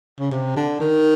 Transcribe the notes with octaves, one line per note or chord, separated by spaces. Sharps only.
C#3
C3
D3
D#3